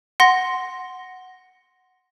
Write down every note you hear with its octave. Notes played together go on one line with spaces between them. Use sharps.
F#5 C6 A#6